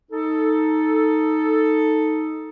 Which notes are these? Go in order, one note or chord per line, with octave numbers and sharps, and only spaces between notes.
D#4 A4